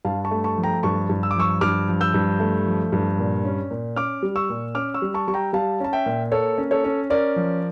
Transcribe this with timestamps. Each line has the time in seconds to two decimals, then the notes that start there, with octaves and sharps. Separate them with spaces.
0.05 G2 F5 A5
0.25 A5 C#6
0.31 A3
0.44 A5 C#6
0.57 F3
0.64 G5 A#5
0.83 G2 A5 C#6
1.09 G2
1.23 E6
1.31 D6
1.36 F3 C#6 E6
1.61 G2 D6 F6
1.88 F3
2.01 E6 G6
2.14 G2
2.40 A3
2.66 F3
2.92 G2
3.18 A#2
3.45 C#4
3.71 A#2
3.96 C#4 D6 F6
4.22 G3
4.36 C#6 E6
4.50 A#2
4.75 C#4 D6 F6
4.94 C#6 E6
5.02 G3
5.14 A5 C#6
5.28 G3 C#6
5.34 G5 A#5
5.53 G3 F5 A5
5.80 C#4 A5
5.93 E5 G5
6.06 A#2
6.32 A#3 A4 C#5
6.58 C#4
6.71 A4 C#5
6.84 C#4
7.10 C#4 A#4 D5
7.36 F3